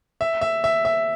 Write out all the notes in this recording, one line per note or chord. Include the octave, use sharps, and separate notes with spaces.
E5
E5
E5
E5